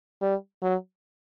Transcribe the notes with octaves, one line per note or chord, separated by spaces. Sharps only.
G3
F#3